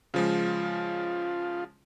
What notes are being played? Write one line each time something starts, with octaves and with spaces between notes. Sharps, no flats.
C#3 F3 G#3 F4